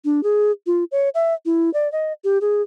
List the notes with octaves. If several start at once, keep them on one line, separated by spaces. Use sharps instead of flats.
D4
G#4
F4
C#5
E5
E4
D5
D#5
G4
G#4